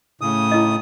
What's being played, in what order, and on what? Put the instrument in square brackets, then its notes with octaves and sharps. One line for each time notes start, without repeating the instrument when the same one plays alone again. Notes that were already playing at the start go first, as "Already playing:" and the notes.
[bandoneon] A2 C#3 D#6
[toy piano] E4 D#5